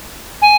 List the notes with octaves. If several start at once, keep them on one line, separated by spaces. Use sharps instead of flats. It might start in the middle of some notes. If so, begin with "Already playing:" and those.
G#5